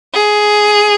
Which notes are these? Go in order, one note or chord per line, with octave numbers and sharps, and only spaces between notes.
G#4